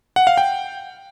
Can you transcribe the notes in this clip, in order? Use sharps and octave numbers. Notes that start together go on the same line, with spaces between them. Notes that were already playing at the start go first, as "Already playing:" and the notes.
F#5
F5
G5